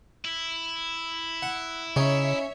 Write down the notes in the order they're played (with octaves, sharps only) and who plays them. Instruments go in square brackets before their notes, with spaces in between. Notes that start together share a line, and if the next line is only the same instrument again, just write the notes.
[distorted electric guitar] E4
[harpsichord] F#5
[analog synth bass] C#3 [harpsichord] C#4 D#4 [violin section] C#5 E5